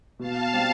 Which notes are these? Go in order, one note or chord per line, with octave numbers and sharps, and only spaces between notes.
B2 F5 A5
G3 C4 G4